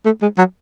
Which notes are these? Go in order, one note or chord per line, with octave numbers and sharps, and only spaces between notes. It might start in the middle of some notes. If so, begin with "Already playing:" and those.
A3
G#3
F#3